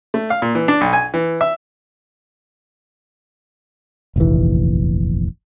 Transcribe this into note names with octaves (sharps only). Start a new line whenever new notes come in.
A3
F5
A#2
E3
D4
B1
G#5
E3
E5
F1 A#1 D#2 E3